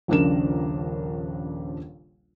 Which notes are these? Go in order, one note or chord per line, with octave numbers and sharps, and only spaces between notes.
D#1 A#1 C#3 D4 A#4 E7